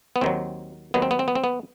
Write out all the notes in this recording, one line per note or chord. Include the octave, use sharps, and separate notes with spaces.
B3
D#2 D#3 F#3 C4
D#2 D#3 F#3 B3
C4
B3
C4
B3
C4
B3